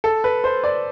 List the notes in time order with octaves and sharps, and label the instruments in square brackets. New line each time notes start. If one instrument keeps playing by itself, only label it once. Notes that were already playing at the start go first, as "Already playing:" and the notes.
[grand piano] A4
B4
C5
D5